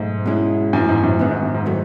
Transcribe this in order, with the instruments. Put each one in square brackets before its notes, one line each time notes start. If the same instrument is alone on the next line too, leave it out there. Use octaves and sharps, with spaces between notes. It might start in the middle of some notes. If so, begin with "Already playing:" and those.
Already playing: [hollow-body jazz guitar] B1 A3 D#4 [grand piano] G#2
[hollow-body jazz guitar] B2 G#3 C#4 E4
[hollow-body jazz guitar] B1 A2 E3 [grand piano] F#2
[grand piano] G#2
F#2
[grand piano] F#2 [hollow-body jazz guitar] D#3 G#3 B3 D#4
[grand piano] G#2
F#2
G#2
[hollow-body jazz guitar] D#3 F#3 A3